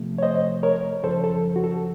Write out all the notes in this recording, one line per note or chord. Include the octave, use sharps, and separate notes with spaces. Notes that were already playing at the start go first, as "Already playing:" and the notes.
Already playing: C3 F3 A3
C#5
C5 D#5
A#4 C#5
F#2 C#3 F3 A4 C5
A4
F#4
A4